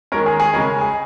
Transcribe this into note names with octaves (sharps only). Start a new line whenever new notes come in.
D#3 G#3 C#4 A#4
G#4
G#4
C#3 G#3 C#4 A#4
G#4